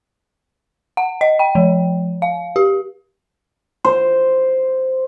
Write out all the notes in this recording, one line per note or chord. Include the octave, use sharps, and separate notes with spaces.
F#5
D#5
G5
F3
F5
G4
C5